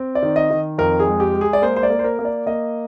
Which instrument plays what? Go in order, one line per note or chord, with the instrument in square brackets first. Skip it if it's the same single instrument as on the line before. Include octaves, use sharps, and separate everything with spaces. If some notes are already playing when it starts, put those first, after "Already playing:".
Already playing: [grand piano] C4
D5
D#3
D#5
D#3
F2 A#4
G#4
G#3
G4
G#3
G#4
D5
A#3 C5
C5
D5
A#3
C5
A#4
A#3
D5
A#3 D#5